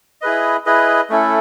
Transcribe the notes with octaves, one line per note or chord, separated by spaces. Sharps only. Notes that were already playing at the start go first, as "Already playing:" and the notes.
E4 G#4 B4 D#5
E4 G#4 B4 D#5
A3 C#4 E4 A4